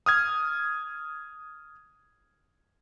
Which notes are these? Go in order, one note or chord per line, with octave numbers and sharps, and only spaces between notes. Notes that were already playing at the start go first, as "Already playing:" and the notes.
D#6 F6 G#6